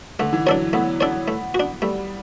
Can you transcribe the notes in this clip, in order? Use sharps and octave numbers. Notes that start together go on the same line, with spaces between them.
D3 A3
E3
F#3 D4 A4 C#5
A3 B3
D4 A4 C#5
A3
F#4
D4
G3 A3